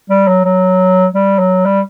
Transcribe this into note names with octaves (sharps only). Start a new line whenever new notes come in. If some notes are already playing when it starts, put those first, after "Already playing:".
G3
F#3
F#3
G3
F#3
G3